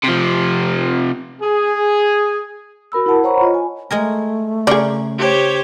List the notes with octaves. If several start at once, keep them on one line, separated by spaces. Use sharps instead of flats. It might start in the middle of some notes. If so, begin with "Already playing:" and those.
C3 F3
G#4
F#4 A#4 B5 E6
E4 A#4 F#5 A5
C5 C#5 F#5 A#5 B5 C#6
F4 C#5 D#5
G#5
G#3 A3 G#4 A#4
C#3 G#4 A#4 D5 C6
G4 C5 C#5